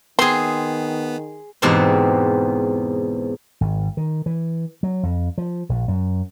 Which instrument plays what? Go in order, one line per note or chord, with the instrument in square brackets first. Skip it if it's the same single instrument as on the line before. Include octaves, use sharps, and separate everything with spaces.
[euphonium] D#3 [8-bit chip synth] B3 [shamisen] C4 [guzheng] G#4 C6
[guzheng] E2 G#2 B2 C4 G4 C5
[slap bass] G#1
D#3
E3
F#3
F2
F3
A#1
F#2